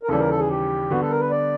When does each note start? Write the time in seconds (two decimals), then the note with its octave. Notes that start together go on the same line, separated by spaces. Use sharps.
0.03 A#4
0.09 D#2 C#3 E3 G3 A4
0.19 A#4
0.30 A4
0.39 G#4
0.50 G4
0.90 D3 G3 B3 F#4
1.01 A4
1.10 A#4
1.21 B4
1.31 D5